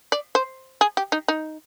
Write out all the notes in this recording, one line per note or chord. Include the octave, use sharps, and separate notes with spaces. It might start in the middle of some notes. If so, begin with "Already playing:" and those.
D5
C5
G#4
G4
D#4
D#4